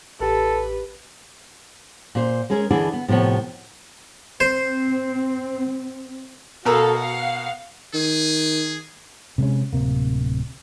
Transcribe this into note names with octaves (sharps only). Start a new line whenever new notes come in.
A1 G4 A4 B4
A#2 C5
G#3 C#4 G#4 A#4
D3 E3 D4 E4 G#4 D#5
B3
A2 C3 F3 B3 C#5
C4 C5
B2 F#4 A4 A#4 F5 E6
F5 F#5
D#3 G#4
C3 G#3 C#4
D1 C3 A#3